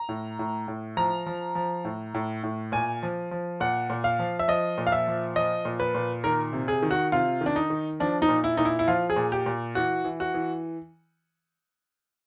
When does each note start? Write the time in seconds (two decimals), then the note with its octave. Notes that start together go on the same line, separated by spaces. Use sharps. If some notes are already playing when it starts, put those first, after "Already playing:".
Already playing: A#5
0.09 A2
0.39 A2
0.68 A2
0.97 F3 A#5
1.26 F3
1.55 F3
1.85 A2
2.14 A2
2.44 A2
2.72 A#2 G#5
3.03 F3
3.31 F3
3.60 A#2 F#5
3.90 A#2
4.04 F5
4.19 F3
4.39 E5
4.48 F3 D#5
4.78 A#2
4.87 F5
4.92 E5
5.08 F3
5.36 F3 D#5
5.65 A#2
5.80 B4
5.95 A#2
6.24 D#3 A#4
6.53 C3
6.68 G#4
6.82 D#3
6.91 F#4
7.12 C3 F4
7.41 D#3
7.46 D4
7.56 D#4
7.70 D#3
8.00 F3 D4
8.22 D#4
8.29 A#2
8.44 E4
8.57 A#2 D#4
8.65 E4
8.79 E4
8.87 F3 F4
9.10 G#4
9.16 A#2
9.32 G4
9.46 A#2
9.75 E3 F#4
10.04 E3
10.20 F#4
10.34 E3